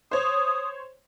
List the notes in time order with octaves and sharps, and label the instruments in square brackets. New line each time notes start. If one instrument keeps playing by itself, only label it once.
[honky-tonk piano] C5 C#5 [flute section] D#6